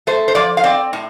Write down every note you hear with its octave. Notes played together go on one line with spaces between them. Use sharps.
A3 C5
C5
F3 D5
F5
C4 D5
A2